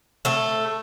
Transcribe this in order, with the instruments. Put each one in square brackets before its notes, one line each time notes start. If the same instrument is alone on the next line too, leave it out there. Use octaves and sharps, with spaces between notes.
[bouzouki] A3 A4